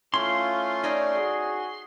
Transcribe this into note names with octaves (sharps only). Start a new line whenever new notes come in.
A3 C#4 E4 F4 C6
D#4 C#5 D5
F#4 G#4